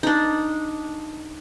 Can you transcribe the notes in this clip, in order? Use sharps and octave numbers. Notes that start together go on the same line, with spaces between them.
D4 D#4